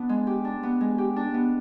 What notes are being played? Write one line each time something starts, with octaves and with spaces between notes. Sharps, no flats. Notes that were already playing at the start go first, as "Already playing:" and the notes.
Already playing: B3 D4
G#3
G4
D4
B3
G#3
G4
D4
B3